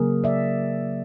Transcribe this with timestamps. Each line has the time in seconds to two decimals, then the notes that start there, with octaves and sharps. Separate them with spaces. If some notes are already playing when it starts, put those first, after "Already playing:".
Already playing: C#3 F#3 A#3 G#4 A#4
0.24 D5 E5